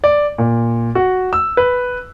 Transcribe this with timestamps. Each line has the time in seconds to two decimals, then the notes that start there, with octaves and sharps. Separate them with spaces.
0.04 D5
0.38 A#2
0.95 F#4
1.33 E6
1.57 B4